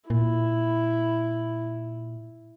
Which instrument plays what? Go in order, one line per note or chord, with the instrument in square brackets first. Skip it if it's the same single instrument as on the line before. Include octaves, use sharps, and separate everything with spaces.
[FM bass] A#2 [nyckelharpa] E4